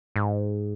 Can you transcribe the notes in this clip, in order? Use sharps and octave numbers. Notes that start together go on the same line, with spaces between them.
G#2